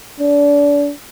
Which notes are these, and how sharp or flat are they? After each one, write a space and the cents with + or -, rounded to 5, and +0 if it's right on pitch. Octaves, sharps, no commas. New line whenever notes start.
D4 -30